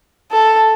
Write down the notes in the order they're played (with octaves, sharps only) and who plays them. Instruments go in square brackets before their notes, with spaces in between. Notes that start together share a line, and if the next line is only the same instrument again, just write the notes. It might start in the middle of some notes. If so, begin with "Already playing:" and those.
[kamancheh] A4